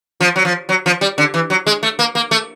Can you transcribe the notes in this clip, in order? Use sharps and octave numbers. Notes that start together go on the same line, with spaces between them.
F3
F#3
F3
F#3
F3
G3
D3
E3
F#3
G#3
A3
A#3
A#3
A3